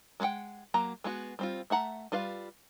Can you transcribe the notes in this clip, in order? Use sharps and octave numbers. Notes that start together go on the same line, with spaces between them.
G#3 F#4 B4 F#5 G5
F#3 A#3 A#5
G#3 B3 F#4
G3 C4 F4
A3 E5 F#5 A#5
G3 F4 B4 F5